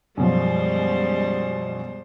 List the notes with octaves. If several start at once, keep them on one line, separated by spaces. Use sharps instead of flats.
F#2 B2 F3 G3 G#3 C5